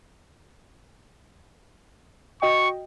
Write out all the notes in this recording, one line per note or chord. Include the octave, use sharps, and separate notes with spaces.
F#4 D#5 G5 C#6